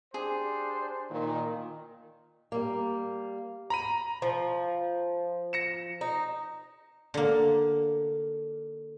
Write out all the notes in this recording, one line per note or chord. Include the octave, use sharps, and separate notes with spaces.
D4 G4 G#4 C5
A#2 D#3
G3 A#3
A#5 B5 D#7
F3
A#6 C#7 E7
D#4
D3 A#3